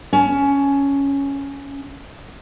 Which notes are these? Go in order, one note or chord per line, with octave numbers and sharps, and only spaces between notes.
C#4 A5